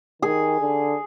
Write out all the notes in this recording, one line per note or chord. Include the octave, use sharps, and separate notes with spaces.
D#3 G#4
D3